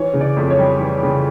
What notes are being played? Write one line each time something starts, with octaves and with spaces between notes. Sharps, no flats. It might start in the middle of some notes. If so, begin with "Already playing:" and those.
Already playing: E3 C#5
C#3
D5
F2
C#5
G3
E3
C#3